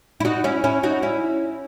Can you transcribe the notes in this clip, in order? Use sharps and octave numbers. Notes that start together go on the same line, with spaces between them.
E4
D#4 F#4
C#4 E4
C#4 E4
D#4 F#4
C#4 E4